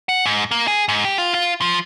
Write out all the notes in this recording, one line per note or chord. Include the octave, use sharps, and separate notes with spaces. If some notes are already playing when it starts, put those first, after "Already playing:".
F#5
G#2
A#3
G#4
G#2
G4
F4
F4
F3